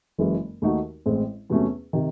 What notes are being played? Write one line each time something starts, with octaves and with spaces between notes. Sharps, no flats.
F#1 F#2 E3 G#3 C#4
D#2 D#3 A3 D#4 F#4
A1 A2 G#3 C4
E2 C3 F#3 A3 C#4
C3 D#3